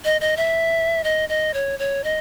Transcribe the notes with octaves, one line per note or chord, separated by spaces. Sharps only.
D#5
D#5
E5
D#5
D#5
C#5
C#5
D#5